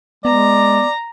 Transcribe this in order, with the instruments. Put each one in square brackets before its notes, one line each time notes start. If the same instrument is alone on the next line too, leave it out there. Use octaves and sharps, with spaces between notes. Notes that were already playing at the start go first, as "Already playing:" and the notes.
[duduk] G#3 [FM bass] B3 [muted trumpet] D5 [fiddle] A#5